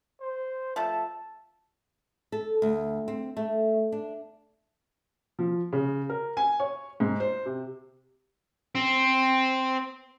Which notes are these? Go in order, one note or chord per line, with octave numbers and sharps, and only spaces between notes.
C5
F3 A3 A4 A5
A4
D2
C4
A3
D4
F3
C#3
A#4
G#5
C#5
G#2
C5
C3
C4